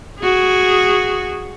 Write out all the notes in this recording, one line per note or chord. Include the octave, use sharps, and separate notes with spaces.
F#4 G#4